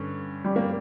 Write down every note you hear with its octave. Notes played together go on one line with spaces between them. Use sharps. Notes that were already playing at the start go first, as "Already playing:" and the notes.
Already playing: G2 D3 C#4
G3
A#3